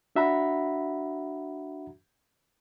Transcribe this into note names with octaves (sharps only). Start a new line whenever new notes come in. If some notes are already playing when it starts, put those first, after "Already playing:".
D4 F#4 E5 F#5 A#5 B5